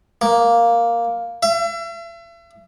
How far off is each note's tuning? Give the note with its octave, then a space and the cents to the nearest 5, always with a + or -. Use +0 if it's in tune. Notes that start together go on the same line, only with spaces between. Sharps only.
A#3 +5
E5 +40